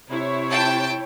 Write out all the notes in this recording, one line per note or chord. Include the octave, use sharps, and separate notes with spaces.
C3 E4 C#5
G5 A5